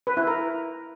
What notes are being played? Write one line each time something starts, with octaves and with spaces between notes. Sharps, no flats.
B4
E4
A#4